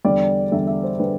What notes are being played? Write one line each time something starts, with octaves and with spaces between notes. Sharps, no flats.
E2 D3 G3 D5
E2 D3 G3 E5
E5
C5
D3 G3 B4